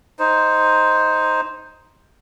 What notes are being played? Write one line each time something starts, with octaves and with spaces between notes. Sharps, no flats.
D#4 C5